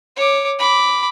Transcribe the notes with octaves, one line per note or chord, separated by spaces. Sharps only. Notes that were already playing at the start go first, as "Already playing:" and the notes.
C#5 D6
B5 D6